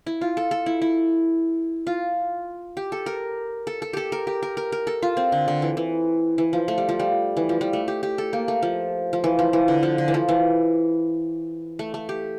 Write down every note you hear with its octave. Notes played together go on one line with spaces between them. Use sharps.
E4
F4
A4
A4
E4
E4
F4
G4
A4
A#4
A4
A4
G4 A4
A#4
G4
A#4
A#4
A#4
A4
F4
C4
D3
D3
E3
E3
E3
F3
A3
G3
F3
G3
E3
F3
G3
A3
G4
G4
A4
A#3
A3
F3
F3
E3
F3
E3
D3
F3
D3
E3
F3
E3
A3
A3
G4